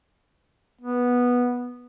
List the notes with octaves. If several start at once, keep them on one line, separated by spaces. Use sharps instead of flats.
B3